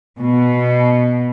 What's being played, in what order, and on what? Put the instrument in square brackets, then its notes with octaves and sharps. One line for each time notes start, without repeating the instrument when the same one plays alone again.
[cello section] B2